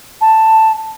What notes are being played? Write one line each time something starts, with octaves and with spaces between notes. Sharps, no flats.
A5